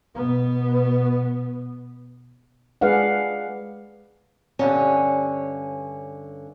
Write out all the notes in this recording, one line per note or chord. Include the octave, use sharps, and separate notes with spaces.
B2 B3
G#3 G#4 B4 D5 F5 F#5
G2 D3 C#4